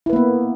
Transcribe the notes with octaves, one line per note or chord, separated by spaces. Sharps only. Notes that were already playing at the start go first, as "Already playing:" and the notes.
A#3 B3 E4 B4